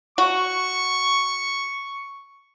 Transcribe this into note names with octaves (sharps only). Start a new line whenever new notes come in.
F#4 C#6